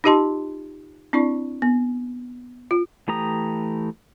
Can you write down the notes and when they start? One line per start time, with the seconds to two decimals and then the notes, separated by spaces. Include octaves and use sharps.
0.04 D#4 F4 G4 D#5 A5 C6
1.13 C4 D4 E4 D5 C#6
1.62 B3
2.71 F4
3.08 E3 A3 G4 A#5 D#6